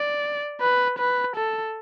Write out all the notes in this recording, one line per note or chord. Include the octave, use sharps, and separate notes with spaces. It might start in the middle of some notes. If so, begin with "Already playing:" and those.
Already playing: D5
B4
B4
A4